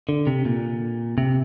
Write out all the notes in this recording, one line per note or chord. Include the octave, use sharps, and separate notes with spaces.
D3
C3
A#2
C3